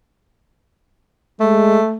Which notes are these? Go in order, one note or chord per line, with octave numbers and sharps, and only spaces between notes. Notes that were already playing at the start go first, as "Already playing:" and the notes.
G#3 A3